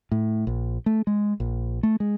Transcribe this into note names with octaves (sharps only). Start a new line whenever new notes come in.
A2
A#1
A3
G#3
A#1
A3
G#3